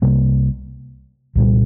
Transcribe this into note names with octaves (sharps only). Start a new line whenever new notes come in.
C2 C3 G3 A#3
C2 A#2 G3